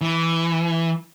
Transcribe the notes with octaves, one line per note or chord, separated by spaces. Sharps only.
E3